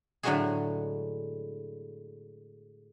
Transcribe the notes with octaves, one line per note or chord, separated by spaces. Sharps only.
A2 D3 F#3 G#3 F#4 G#4